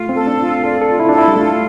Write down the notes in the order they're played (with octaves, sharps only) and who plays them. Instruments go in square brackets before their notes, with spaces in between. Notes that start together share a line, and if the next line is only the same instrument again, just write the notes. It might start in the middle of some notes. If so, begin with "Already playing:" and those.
Already playing: [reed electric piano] A3 [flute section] F4
[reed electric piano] C4
[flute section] A4
[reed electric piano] D4
[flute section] F4
[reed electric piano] A4 [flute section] D5
[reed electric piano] A4
[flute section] F4
[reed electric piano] E4
[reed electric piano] D4 [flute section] A4
[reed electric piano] E4
G3
[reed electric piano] A3 [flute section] F4